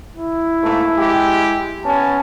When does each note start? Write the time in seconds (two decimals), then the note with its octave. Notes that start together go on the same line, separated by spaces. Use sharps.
0.16 E4
0.63 G#2 A3 A#3
0.98 G#3 G4
1.85 B3 C#4 A5